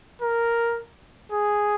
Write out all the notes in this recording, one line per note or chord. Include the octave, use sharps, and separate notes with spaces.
A#4
G#4